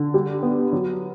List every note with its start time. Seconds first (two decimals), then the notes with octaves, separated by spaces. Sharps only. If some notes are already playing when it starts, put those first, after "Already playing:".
Already playing: D3
0.14 G3
0.43 B3
0.73 F#3